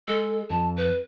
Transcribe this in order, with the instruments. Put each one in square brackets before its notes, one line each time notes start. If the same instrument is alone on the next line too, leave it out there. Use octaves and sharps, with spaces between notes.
[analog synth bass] G#3 [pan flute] A4
[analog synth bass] F2 [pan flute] A5
[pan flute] B4